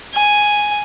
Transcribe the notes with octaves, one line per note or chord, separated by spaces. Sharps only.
G#5